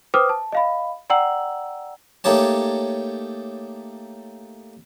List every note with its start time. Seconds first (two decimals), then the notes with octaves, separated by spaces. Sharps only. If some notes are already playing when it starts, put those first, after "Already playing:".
0.14 B4 C5 G5 D6 D#6 F6
0.29 A5
0.52 D#5 F5 B5
1.10 D5 F#5 G5 A#5 E6 F#7
2.24 A3 A#3 D#4 G4 C#5 A5